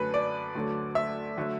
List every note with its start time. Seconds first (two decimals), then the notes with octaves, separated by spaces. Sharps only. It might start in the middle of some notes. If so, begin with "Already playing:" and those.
Already playing: F#2 D3 A3 B4
0.14 D5
0.55 D2 D3 F#3 A3
0.95 E5
1.37 D3 F#3 A3